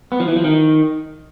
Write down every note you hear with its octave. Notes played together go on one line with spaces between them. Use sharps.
B3
F3
E3
F3
D#3